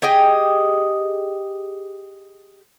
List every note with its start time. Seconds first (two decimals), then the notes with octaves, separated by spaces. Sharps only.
0.02 G4 G#4 D#5 G5